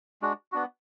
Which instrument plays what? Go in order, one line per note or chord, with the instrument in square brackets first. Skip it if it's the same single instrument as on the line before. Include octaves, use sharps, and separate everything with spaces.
[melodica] G#3 D4 F#4
B3 D4 F#4